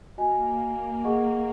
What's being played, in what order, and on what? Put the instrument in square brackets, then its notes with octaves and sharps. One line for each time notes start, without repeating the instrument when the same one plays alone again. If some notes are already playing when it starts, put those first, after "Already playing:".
[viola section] A#3 [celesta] F#4 D#5 G#5
[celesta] G#4 D#5 F#5 C#6